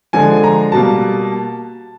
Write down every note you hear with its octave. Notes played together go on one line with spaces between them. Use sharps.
D3 F3 G#3 G#5
A#5
B2 G3 A#3 A5